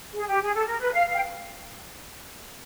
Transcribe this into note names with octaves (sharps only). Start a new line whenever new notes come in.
G#4
G4
G#4
A4
A#4
B4
F5
F5
G5